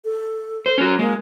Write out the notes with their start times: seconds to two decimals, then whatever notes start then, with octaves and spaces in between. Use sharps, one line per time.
0.05 A4
0.66 C5
0.78 C#4 F#4
0.99 G#3 A#3